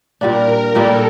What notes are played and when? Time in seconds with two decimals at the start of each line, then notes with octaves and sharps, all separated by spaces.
0.21 A#2 G3 A#3 D4 A#4
0.75 A#2 G3 A#3 D4 A4